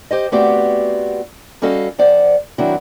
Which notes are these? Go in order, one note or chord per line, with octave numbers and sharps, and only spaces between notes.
G4 C5 D#5
A3 B3 C4 F#4 G4 D5
G3 C#4 F#4 A4 D#5 F5
F2 C5 D5 F#5
D#3 F#3 C4 D4 E4 F#4